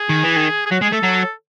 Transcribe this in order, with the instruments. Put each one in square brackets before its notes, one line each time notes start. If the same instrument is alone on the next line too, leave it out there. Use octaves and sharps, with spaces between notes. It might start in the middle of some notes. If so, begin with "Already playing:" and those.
Already playing: [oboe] G#4
[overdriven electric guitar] D#3
E3
D#3
[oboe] G#4
[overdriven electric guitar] F#3 [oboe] F#4
[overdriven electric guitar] G#3 [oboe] G#4
[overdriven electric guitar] A3 [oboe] A4
[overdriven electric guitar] F#3